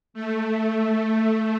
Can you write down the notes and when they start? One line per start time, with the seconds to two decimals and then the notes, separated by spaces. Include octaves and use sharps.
0.14 A3